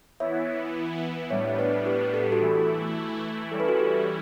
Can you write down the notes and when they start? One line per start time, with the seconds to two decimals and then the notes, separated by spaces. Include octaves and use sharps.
0.20 E3 B3 E4 C#5 E5
1.30 A2 G3 B3 D4 C#5 E5
1.49 E5
1.59 B4 D5
1.86 G4 B4
2.14 A4
2.23 G4
2.32 F#4 A4
2.41 E3 A3 E4
3.51 E3 G3 C#4 E4 A4
3.60 B4
3.68 F#4 A4
3.80 G4